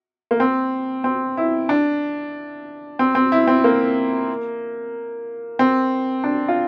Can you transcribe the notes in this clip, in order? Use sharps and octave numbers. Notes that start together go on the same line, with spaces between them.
A#3
C4
C4
E4
D4
C4
C4
E4
C4
A#3
C4
D4
F4